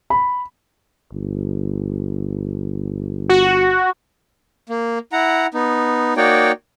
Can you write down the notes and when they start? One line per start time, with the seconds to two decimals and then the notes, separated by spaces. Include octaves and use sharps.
0.10 B5
1.12 G1
3.29 F#4
4.69 A#3
5.13 E4 F#5 A#5
5.54 B3 D#4
6.17 A#3 D#4 F#4 C#5 D5 G5